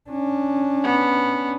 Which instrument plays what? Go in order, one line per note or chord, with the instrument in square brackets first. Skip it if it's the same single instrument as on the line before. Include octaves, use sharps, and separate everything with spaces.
[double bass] C#4 D4
[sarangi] B3